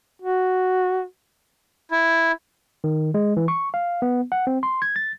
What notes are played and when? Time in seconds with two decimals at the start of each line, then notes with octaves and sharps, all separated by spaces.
0.22 F#4
1.91 E4
2.84 D#3
3.14 G#3
3.37 E3
3.48 C#6
3.74 F5
4.02 B3
4.32 F#5
4.47 C4
4.63 C6
4.82 G#6
4.96 A6